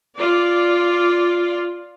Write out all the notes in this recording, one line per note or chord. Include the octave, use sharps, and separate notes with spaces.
F4 D5